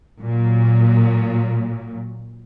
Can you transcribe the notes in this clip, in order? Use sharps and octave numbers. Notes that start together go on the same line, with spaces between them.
A#2 F#3